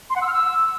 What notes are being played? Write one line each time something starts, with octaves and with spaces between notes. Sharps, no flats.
C6
F#5
E6
F6
E6